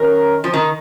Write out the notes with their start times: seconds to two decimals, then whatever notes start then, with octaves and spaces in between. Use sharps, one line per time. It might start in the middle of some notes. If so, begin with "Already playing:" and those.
Already playing: D#3 C#4 A#4
0.44 F3
0.54 D#3